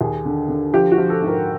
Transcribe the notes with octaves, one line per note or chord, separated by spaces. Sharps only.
D#2 G#4
D3
D3
F3 G4
F#4
F3
A4
G#2
A#4